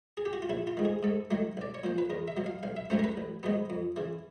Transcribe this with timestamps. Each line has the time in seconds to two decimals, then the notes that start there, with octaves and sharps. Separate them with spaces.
0.17 G#4
0.26 G4
0.33 F#4
0.42 F4
0.49 A#1 E4
0.67 F4
0.77 G#2 D#3
0.85 G#4
1.03 G#2 A4
1.31 D#3 F#3 A3
1.57 B1 D5
1.74 C#5
1.84 A#2 F3 C5
1.98 B4
2.10 E2 A#4
2.28 E5
2.37 B2 F#3
2.46 F5
2.63 B1 F5
2.77 E5
2.90 A2 F#3 A3 C#4 C5
2.99 A#4
3.04 B4
3.17 A1
3.43 G#2 D#3 F#3 B3
3.70 F2
3.96 C#3 E3